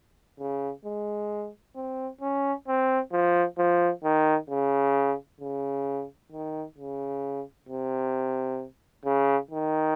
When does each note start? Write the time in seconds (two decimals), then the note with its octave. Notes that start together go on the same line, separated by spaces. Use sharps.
0.39 C#3
0.85 G#3
1.76 C4
2.21 C#4
2.68 C4
3.12 F3
3.58 F3
4.04 D#3
4.50 C#3
5.41 C#3
6.32 D#3
6.78 C#3
7.69 C3
9.05 C#3
9.51 D#3